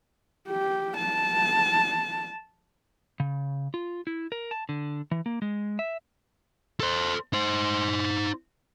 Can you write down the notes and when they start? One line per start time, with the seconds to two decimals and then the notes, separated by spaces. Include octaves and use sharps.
0.49 G4
0.97 A5
3.20 C#3
3.74 F4
4.07 E4
4.32 A#4
4.51 A5
4.69 D3
5.11 E3
5.26 A#3
5.42 G#3
5.79 E5
6.80 A4 C5
7.33 D#4 C5